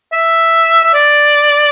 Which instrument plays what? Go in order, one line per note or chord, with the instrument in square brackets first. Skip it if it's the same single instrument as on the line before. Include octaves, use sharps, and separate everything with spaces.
[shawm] E5
E5
D5